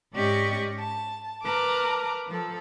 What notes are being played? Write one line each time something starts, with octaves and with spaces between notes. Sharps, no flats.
G#2 C#4 G4 D5 D#5 C#6
A5
A#4 B4 A5 D6
F3 A4